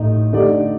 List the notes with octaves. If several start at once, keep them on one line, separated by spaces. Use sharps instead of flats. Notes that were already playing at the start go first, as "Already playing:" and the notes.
Already playing: A1 A2 A3 D#4
D3 A3 D#4 G4 D5